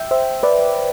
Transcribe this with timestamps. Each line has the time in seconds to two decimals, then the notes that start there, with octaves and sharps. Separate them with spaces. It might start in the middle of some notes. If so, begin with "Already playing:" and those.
Already playing: E5 G5
0.11 C5 E5
0.43 B4 D5